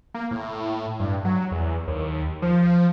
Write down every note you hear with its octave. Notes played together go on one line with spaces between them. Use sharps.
A#3
A2
G2
F#3
E2
D#2
F3